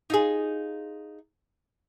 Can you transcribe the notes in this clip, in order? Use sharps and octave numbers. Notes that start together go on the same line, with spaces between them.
D#4 F4 G#4